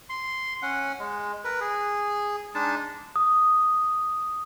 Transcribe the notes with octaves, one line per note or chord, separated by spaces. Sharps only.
C6
C#4 F#5
G#3
A#4 B4
G#4
G#3 D4 D#4 A5
D#6